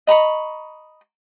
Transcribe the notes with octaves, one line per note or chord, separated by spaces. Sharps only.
D#5 A#5 B5 C#6